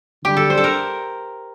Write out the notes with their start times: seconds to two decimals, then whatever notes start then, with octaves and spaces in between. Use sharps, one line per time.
0.24 D3 G3 D4 G4
0.37 A4
0.50 C5
0.58 A4
0.64 A#4